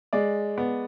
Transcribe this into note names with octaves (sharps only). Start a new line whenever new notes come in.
G#3 D5
B3